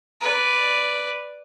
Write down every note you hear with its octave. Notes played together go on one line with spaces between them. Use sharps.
B4 D5